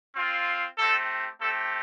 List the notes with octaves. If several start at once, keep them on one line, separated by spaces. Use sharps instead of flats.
C4 F4
A3 C4 G4 A4
A3 C4 G4 A4